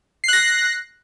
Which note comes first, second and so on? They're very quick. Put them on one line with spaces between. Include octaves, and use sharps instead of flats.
C7 F#6 A#6